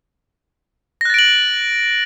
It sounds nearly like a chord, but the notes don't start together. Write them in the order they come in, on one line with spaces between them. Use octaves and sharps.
A#6 F#6 A6 D7 F#7